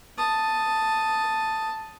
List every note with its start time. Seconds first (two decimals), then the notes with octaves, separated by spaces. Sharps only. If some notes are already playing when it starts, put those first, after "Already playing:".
0.18 A5 D#6